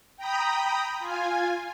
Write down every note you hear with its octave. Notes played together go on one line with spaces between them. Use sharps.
G5 A#5 B5 D#6
F4 G#5